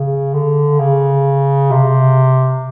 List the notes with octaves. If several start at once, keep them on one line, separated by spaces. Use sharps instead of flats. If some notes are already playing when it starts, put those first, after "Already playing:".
Already playing: C#3
D3
C#3
C3